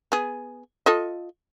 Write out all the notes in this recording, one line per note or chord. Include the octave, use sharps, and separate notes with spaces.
B3 G#4
F4 A4 D#5